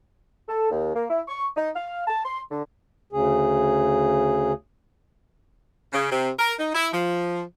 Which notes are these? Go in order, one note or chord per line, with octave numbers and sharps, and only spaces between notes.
A4
D#2
A#3
E4
C#6
D#4
F5
A5
C6
D3
D2 C#3 G#4
C#3
C3
A#4
D#4
E4
F3